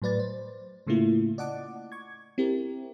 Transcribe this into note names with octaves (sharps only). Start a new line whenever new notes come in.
A2 F#3 B4 D5 A6
C5
A2 C#3 A3 A#3 E4 F4
D5 D#5 F#5 A5 D6
C#6 G#6
C4 E4 G4 A#4